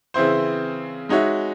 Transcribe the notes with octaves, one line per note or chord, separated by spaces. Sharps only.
C#3 E3 C4 E4 C5
G#3 D#4 F#4 C#5 E5